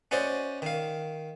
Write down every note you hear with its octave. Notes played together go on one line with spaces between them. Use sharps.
C#4 F#4 C5 D5 D#5
D#3 F5